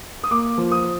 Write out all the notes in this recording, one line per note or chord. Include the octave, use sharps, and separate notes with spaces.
D#6
A#3 D6
F3
D#6